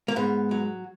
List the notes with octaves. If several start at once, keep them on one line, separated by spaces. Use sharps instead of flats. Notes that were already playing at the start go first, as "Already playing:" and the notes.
A#3
G#2 B3
F#3